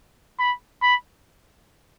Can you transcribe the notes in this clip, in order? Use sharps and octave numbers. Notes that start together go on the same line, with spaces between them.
B5
B5